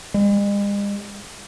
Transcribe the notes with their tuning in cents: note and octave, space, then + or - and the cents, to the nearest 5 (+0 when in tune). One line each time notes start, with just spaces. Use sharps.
G#3 -45